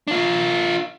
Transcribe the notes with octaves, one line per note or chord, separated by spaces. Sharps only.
D4 F4